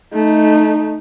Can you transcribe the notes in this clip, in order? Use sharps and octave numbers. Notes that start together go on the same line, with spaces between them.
A3 D#4